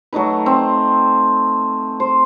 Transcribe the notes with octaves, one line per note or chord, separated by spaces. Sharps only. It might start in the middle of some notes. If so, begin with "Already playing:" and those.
F#3 A3 D#4 B4
C4
C5